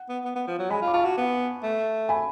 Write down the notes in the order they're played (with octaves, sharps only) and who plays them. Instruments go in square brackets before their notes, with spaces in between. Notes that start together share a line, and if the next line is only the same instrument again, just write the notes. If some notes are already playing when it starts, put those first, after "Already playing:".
Already playing: [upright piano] F#5
[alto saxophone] B3
B3
B3
F3
F#3
[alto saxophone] G#3 [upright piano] G#5 B5
[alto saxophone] F4
[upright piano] D6
[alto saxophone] F4 [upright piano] A5 C#6
[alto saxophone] F#4
B3
A3
[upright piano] G#5 B5